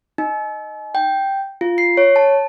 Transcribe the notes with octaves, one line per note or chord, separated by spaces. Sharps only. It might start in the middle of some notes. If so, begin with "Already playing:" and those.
D#4
G5
F4
C7
C#5
A5